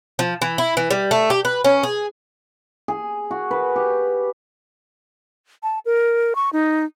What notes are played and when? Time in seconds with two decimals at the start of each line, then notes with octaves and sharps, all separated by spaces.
0.19 F3
0.42 E3
0.58 E4
0.77 E3
0.90 G3
1.11 A3
1.30 G4
1.45 B4
1.64 C#4
1.83 G#4
2.88 G#4
3.31 F#4
3.51 B4
3.76 G4
5.63 A5
5.86 A#4
6.35 C#6
6.53 D#4